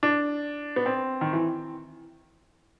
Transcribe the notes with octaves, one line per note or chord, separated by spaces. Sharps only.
D4
B3
C4
D#3
E3